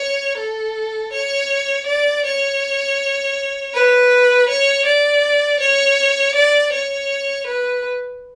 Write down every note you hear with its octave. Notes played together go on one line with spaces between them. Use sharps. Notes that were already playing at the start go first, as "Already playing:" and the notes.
Already playing: C#5
A4
C#5
D5
C#5
B4
C#5
D5
C#5
D5
C#5
B4